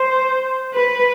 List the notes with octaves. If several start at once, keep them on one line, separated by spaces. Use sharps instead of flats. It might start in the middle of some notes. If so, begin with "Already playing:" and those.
Already playing: C5
B4